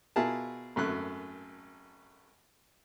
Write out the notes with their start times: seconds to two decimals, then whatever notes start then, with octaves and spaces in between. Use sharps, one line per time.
0.16 B2 E4 F4 G#4 A#4 A5
0.76 G#1 F#2 A3 F#6